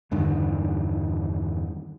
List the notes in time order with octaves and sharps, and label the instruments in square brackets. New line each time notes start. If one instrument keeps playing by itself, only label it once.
[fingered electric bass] E2 G2 D3 D#3